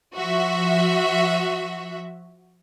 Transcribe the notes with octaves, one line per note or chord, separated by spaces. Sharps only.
F3 F#4 E5